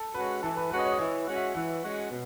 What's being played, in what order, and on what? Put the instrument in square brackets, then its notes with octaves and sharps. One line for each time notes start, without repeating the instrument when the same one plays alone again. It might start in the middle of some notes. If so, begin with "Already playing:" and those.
Already playing: [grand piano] A4
[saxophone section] G#3 C#4 F#4 [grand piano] B4
[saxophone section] E3 [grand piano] A4
[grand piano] B4
[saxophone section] G#3 C#4 F#4 [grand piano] B4
[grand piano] D#5
C#5
D#5
[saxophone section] E3 [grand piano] C#5
[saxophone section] G#3 C#4 F#4
[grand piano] E5
[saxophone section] E3 [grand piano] F#5
[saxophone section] G#3 C#4 F#4
B2